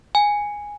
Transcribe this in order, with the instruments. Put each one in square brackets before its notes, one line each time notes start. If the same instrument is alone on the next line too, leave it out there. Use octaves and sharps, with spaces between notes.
[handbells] G#5